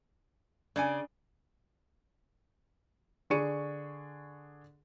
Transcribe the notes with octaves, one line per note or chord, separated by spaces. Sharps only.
C#3 D4 D5 G#5
D3 D4 G#4 C#6 C#7 D#7